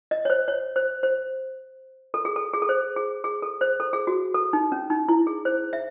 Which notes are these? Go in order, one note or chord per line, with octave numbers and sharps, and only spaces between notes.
D#5
C#5
C5
C#5
C5
C5
A4
G#4
A4
G#4
A4
C5
G#4
G#4
A4
C5
A4
G#4
F#4
A4
D#4
C#4
D#4
E4
G#4
C5
E5